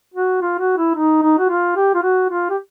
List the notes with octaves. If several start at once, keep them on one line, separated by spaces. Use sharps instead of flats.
F#4
F4
F#4
E4
D#4
D#4
F#4
F4
G4
F4
F#4
F4
G4